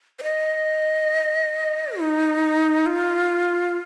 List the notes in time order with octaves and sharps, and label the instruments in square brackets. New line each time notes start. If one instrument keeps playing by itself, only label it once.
[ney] C5
D#5
D#4
F4